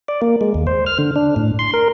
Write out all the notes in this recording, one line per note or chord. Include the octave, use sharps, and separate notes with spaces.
D5
A#3
G#3
D#2
C5
F6
D3
D4
A2
C6
A#4